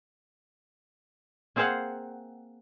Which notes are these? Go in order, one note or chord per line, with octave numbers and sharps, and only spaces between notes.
A#3 C4 G#4 C5 F5 F#5